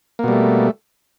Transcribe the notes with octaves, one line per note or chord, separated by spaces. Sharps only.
B2 G3 A3 A#3